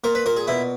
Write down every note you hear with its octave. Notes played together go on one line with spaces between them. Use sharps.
A#2 A#4
B4
A#2 A#4
G#4
B2 E4